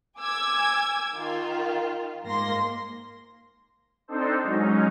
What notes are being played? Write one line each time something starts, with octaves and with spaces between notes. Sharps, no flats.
G#5 D6 E6 G#6
D#3 F4
G#2 A#3 C6 A#6
C4 D4 D#4 A4 C5
F#3 G#3 C#4 D#4